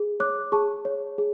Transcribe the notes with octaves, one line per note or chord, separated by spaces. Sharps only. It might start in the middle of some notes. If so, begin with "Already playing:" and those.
Already playing: G#4
C#5 D6 F#6
G#4 A5 C#6
C#5
G#4